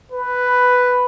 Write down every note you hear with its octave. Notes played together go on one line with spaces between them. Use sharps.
B4